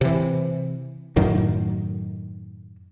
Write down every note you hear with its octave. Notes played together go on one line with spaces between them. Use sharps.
C3 E3
F#2 A2 D#3 F#3